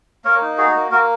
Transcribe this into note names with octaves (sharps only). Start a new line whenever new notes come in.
A#3 A#4 C#5
D#4
F#4 G#4
A#3
A#3 F#4 A#4